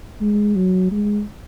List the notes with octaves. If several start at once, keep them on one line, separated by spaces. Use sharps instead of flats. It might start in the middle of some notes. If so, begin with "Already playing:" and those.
G#3
F#3
G#3